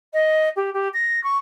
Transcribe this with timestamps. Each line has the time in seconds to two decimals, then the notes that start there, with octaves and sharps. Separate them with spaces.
0.13 D#5
0.56 G4
0.73 G4
0.93 A#6
1.23 C#6